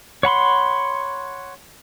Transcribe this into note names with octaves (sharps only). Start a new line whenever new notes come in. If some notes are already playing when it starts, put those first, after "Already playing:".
C#5 F#5 B5 C6